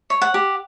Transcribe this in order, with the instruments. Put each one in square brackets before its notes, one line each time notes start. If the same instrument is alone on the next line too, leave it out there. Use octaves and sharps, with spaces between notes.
[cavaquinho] C#5
F#5
G4